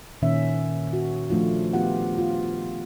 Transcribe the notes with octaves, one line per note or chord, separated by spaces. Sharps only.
A#2 D#3 C#4 E5
F#4
F3 A3 D4 F4
B3 F4 G4 F#5
F4